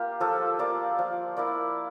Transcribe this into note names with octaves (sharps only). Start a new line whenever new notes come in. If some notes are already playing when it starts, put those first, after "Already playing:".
Already playing: A#3 F4 G4
F3 A4
A#3 F4 D5
F3
A#3 E4 D5